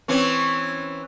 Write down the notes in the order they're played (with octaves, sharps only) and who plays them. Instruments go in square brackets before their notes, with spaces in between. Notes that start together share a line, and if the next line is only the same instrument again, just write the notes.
[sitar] E3 C4 C#4